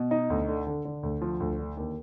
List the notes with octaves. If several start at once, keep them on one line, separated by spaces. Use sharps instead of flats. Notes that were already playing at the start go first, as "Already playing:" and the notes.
Already playing: B2
D#4
D2
D3
D3
D3
D2
F3
D2
D3
D#2